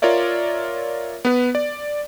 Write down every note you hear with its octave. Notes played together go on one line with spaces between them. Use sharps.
F4 A#4 C#5 D5 E5
B3 B4
D5